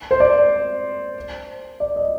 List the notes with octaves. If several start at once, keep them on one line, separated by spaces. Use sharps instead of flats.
C5
D5
D5
D#5